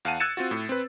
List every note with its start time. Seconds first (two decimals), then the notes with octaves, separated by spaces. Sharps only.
0.05 E2 F5 F#5 A5 D#7
0.20 E6 F#6 G#6 A6 C#7 E7
0.37 C4 F4 F#4
0.51 A2
0.69 C4 B4